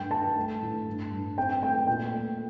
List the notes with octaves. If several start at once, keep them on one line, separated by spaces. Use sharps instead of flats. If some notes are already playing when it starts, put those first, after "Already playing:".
Already playing: G2 A3 G5
G2 A5
A3
A2
G2
G2
C4 G5
A3 G5
A#2 G5
A3